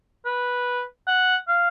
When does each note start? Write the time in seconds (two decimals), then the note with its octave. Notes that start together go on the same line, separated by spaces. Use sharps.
0.25 B4
1.07 F#5
1.48 F5